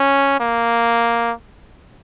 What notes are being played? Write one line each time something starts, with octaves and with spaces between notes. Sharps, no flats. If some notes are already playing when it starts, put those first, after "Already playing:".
Already playing: C#4
A#3